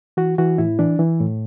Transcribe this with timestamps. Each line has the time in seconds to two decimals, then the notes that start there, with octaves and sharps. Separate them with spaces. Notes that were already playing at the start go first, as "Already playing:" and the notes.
0.17 E3 F#4
0.38 E3 F#4
0.58 A2 E4
0.79 E3 D4
0.99 E3
1.20 A2